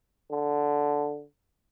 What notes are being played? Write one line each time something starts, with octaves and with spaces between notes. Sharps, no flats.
D3